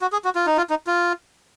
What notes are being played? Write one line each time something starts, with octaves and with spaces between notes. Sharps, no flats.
F#4
G#4
F#4
F4
D#4
F4
D#4
F4